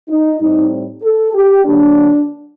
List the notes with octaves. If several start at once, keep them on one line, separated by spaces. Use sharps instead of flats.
D#4
A2 G3 C4 D#4
A4
G4
D3 F#3 A#3 D4